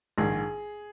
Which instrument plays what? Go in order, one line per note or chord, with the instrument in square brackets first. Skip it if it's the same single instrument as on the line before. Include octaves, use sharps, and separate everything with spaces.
[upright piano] A#1 G#2 D#3 [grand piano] G#4